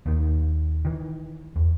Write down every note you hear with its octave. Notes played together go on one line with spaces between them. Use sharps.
D#2 D#3
D#3 E3
E2